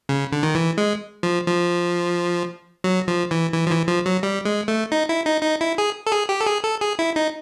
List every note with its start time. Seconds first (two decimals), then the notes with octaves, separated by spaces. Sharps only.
0.09 C#3
0.32 D3
0.43 D#3
0.55 E3
0.78 G#3
1.23 F3
1.47 F3
2.84 F#3
3.08 F3
3.31 E3
3.53 E3
3.67 F3
3.70 E3
3.88 F3
4.06 F#3
4.23 G3
4.45 G#3
4.68 A3
4.92 D#4
5.09 E4
5.26 D#4
5.43 D#4
5.61 E4
5.78 G#4
6.07 A4
6.12 G#4
6.29 G4
6.41 A4
6.46 G#4
6.64 A4
6.81 G#4
6.99 E4
7.16 D#4